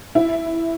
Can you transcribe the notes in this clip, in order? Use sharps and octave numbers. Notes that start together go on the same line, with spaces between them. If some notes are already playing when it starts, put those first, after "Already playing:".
E4